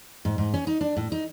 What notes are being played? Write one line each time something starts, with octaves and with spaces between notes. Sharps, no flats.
G#2
G#2
C#4
D#4
D4
A2
D#4